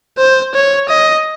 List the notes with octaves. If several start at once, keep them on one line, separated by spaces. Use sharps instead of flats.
C5
C#5
D#5